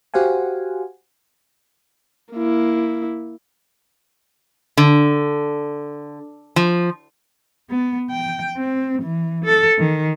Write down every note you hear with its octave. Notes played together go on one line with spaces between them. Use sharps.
F#4 G4 C5 F5 F#5 G#5
A#3 E4
D3
F3
B3
G5
C4
E3
A4
D#3